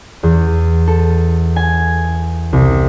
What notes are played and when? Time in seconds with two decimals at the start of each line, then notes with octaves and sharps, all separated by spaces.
0.23 E2
0.87 A4
1.56 G#5
2.53 C2